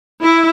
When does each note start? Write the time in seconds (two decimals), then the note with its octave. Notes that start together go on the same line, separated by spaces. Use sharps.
0.22 E4